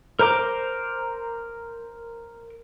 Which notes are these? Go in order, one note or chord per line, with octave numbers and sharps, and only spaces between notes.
A#4 C5 A#5 D6